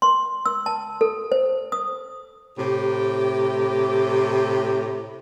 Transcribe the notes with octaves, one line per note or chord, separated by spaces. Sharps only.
C6
E6
A5
A4
C5
D#6
A2 C3 G4